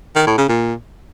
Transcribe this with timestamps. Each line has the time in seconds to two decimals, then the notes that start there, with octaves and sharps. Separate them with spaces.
0.16 D#3
0.27 A2
0.38 C#3
0.49 A#2